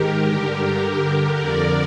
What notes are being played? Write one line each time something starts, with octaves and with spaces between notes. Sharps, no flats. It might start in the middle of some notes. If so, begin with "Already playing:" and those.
Already playing: G#2 D#3 G4 A#4
G2 D3 G4 A#4
F2 D3 A#4 D5